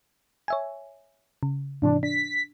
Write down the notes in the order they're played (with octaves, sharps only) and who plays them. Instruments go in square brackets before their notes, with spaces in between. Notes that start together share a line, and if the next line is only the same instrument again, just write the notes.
[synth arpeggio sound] C#5 E5 G#5
C#3
[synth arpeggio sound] G#2 C3 E3 [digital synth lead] D4
[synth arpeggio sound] D4 [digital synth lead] B6